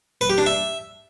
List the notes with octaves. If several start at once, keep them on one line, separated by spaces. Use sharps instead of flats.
B4
G4
D4
E5